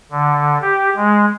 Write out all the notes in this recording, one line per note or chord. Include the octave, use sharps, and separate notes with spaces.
D3
G4
G#3